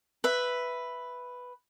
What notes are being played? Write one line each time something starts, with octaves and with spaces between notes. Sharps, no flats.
B4 E5